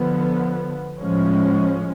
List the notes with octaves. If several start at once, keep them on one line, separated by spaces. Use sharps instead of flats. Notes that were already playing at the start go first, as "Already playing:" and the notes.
Already playing: D3 F3 B3
A2 F3 G#3 C#4